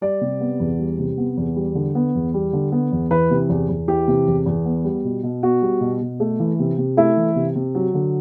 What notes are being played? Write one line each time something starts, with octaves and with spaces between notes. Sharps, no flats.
G3 D5
C3
B3
E2
G3
C3
B3
E2
G3
D3
B3
E2
G3
D3
B3
E2
E3 B4
C3
E2
E2
E3 G4
C3
E2
E2
B3
G3
B2
B2
B3 F#4
G3
B2
B2
A3
E3
C3
C3
A3 E4
E3
C3
C3
F#3
D3